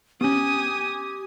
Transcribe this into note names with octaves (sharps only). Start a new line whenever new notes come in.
B3 C#4 G4 G#5 D#6